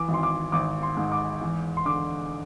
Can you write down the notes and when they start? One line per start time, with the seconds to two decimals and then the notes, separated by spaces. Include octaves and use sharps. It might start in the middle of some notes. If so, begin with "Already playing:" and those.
Already playing: E3 D6
0.09 G#1
0.14 C6
0.23 D6
0.52 G#1 D6
0.83 C6
0.97 G#2
1.12 D6
1.41 E2
1.77 C6
1.85 D3 D6